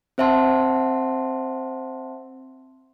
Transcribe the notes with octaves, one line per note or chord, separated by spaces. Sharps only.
C4 C5 E5 F#5 A5 C6